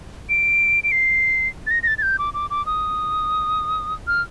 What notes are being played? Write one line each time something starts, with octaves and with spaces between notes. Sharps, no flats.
D7
D7
C7
A6
A#6
A#6
A6
A6
G6
D6
D6
D6
D#6
F6